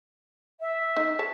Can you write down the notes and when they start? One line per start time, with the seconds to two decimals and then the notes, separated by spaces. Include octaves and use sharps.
0.60 E5
0.97 D#4
1.19 C#5 A5